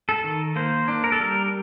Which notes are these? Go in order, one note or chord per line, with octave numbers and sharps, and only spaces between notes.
A4
D#3
A#3 C5
D4
A#4
A4
G3 A#4